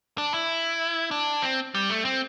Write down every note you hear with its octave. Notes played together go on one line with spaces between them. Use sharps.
D4
E4
D4
C4
G3
A3
C4